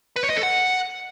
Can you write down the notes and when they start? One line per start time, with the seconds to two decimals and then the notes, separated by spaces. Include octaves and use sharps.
0.16 B4
0.23 C#5
0.30 D#5
0.36 A4
0.43 F#5